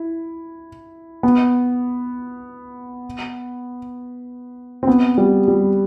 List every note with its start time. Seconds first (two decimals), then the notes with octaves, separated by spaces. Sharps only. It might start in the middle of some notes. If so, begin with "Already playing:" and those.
Already playing: E4
1.23 B3
4.83 C4
4.87 B3
5.18 G3
5.48 G3